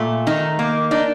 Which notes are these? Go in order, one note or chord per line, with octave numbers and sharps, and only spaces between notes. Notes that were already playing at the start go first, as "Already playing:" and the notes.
Already playing: A#2 A3
D#3 D#4
A#3
D4 D#4